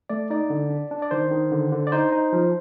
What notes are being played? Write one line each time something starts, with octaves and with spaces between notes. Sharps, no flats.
A3 D5
D#4 D5
D3
D4
D4
D5
D#3 C5
D#3
D3
D3
D5
D#4 C5
D#4
F3